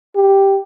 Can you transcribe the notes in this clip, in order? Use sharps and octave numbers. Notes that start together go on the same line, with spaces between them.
G4